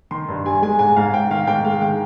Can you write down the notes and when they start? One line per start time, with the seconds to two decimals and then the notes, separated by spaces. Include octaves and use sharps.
0.11 D#3 C6
0.28 G2
0.45 G3 G#5
0.62 G#3 G#5
0.79 G#2 G#5
0.96 G#2 F5
1.14 G#2 G5
1.30 D#3 F5
1.47 G#2 G5
1.65 G#3 F5
1.81 D#3 G5